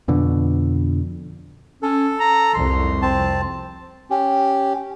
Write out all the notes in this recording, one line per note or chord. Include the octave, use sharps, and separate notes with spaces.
F2 B2 D3
C#4 A4
A#5
C2 F2 C6
C4 A5
C#4 G4